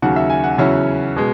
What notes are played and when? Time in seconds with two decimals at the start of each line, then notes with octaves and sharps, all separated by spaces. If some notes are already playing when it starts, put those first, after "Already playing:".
0.02 D#2 C#3 F#3 F#5
0.16 E5
0.30 G#5
0.44 F#5
0.58 E2 C#3 F#3 C#4 E4
1.16 B2 G#3